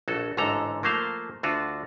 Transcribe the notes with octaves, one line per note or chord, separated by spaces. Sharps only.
A#1 F#4 A4
A1 G#2 D3 A4 A#5
F3 A3 A#3 C5 F5
D2 D3 F4 F#4